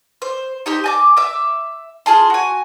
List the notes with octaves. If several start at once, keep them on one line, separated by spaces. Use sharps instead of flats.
C5
D#4 G4 C5
G#5 A5 D6
E5 D6
F4 G#4 A5 C6
F#4 G#5